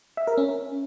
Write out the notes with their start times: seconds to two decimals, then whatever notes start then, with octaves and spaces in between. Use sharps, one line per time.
0.17 E5
0.27 A#4
0.37 C#4